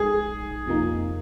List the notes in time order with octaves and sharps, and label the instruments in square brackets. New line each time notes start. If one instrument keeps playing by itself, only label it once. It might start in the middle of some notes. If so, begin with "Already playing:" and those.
Already playing: [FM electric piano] A#1 G#3 D#4 [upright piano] G#4
[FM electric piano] F2 C3 F3 A#3 D#4